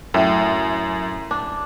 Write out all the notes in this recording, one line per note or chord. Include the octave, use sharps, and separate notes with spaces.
F#2 A2
D4